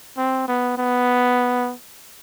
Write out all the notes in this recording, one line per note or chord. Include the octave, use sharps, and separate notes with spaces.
C4
B3
B3